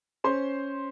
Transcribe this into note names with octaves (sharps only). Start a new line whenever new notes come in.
C#4 C5 C6